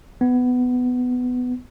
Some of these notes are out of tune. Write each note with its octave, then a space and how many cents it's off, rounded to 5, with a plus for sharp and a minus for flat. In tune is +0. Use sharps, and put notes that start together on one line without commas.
B3 +15